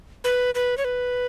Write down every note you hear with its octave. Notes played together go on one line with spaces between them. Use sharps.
B4
B4
C#5
B4